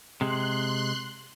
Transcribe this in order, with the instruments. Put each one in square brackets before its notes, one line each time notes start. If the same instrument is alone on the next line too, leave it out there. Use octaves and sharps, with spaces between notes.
[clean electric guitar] C3 G#3 [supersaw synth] C6 F#6